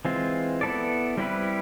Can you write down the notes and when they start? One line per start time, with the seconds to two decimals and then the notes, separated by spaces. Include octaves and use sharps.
0.05 E3 G#3 C4 F4
0.61 B3 E4 A4 D5
1.17 G3 C4 E4 G4 B4